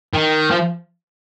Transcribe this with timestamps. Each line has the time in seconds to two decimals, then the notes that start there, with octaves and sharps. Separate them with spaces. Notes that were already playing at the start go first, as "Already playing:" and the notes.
0.14 D#3
0.51 F3